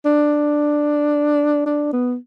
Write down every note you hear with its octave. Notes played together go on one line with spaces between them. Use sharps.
D4
D4
B3